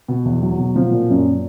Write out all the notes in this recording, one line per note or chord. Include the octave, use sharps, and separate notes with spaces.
B2
E2
F#3
B2
F3
A#2
F#2